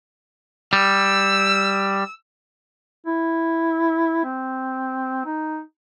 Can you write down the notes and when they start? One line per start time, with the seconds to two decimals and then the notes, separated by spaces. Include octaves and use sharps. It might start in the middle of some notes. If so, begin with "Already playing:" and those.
0.73 G3 E6
3.06 E4
4.25 C4
5.25 D#4